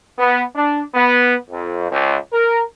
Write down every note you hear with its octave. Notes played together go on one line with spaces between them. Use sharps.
B3
D4
B3
F2
C#2
A#4